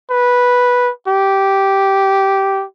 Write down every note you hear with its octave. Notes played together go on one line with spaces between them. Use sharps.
B4
G4